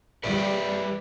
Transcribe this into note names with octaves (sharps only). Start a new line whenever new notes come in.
G3 B4 D5 E5